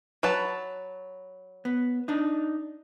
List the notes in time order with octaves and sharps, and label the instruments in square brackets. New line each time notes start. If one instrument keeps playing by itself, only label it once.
[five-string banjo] F#3 B4 A5
[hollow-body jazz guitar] B3
D4 D#4